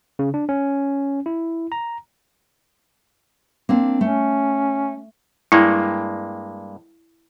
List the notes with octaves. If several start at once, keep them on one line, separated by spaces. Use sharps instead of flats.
C#3
D4
C#4
E4
A#5
A#3 C4 D4
A3 C#4
G2 G#3 A#3 E4